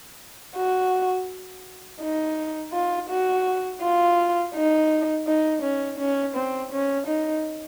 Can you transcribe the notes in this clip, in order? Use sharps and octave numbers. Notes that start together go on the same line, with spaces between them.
F#4
D#4
F4
F#4
F4
D#4
D#4
C#4
C#4
C4
C#4
D#4